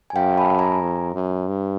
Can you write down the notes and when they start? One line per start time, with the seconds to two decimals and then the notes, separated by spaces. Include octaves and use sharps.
0.10 G#5
0.16 F#2 F5 G5
0.38 A5 B5
0.59 G#5 A#5
0.81 F2
1.14 F#2
1.48 G2